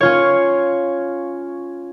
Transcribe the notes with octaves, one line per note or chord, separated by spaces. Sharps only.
C#4 F4 C#5